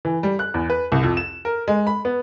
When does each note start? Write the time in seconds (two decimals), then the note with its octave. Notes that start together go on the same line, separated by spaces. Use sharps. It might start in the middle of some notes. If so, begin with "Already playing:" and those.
0.05 E3
0.23 G3
0.39 F#6
0.54 E2
0.70 B4
0.92 C2
1.03 F2
1.17 E7
1.45 A#4
1.68 G#3
1.87 B5
2.05 B3